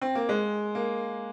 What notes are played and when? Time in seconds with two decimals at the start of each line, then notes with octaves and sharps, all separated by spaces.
0.02 C4
0.15 A#3
0.29 G#3
0.75 A#3